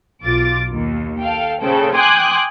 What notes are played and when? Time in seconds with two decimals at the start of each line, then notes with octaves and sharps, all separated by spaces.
0.24 B1 F4 D6 A6
0.73 D#2
1.21 A4 F5 G5
1.62 A#2 C#3 A4 C5 G5
1.93 G5 G#5 C6 D6 D#6 F#6